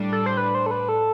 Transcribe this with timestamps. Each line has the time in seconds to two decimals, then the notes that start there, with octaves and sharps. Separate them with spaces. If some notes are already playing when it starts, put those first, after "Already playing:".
Already playing: A2 G3 D4
0.12 A4
0.26 C5
0.37 B4
0.55 C5
0.66 A4
0.71 B4
0.89 A4